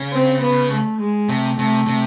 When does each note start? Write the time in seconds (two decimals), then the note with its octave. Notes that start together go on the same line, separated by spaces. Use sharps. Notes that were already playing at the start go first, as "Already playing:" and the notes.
Already playing: C#3
0.12 C4
0.41 B3
0.71 A3
1.00 G#3
1.29 C3 A3
1.58 C3 A3
1.87 C3